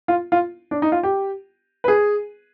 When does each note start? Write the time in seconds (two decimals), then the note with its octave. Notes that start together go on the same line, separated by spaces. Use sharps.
0.08 F4
0.32 F4
0.71 D4
0.82 D#4
0.92 F4
1.03 G4
1.84 B4
1.88 G#4